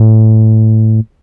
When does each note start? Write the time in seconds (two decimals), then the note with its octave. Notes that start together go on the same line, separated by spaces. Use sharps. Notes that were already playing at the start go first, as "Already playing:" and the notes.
Already playing: A2